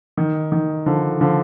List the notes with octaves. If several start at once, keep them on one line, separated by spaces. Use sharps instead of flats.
D#3
D#3
D3 F3
D3 F3